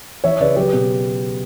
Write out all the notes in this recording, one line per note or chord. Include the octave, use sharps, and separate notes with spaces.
E3 C#5 E5
C#3 B4 D5
F#3 G4 B4
B2